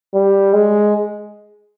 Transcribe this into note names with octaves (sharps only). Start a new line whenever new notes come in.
G3
G#3